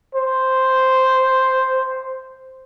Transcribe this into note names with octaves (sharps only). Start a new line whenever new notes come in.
C5